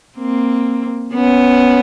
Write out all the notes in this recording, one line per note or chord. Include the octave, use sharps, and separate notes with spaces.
A#3 C4
B3 C#4